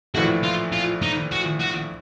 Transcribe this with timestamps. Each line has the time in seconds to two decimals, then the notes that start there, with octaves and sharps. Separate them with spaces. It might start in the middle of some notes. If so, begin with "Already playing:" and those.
0.15 A#1 A2 E3 A3 F#4
0.44 F4
0.73 F4
1.02 D#4
1.31 F#4
1.60 F#4